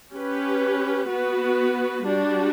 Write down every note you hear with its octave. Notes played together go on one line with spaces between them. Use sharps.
C#4 G4 B4
B3 F#4 B4
G3 D4 F#4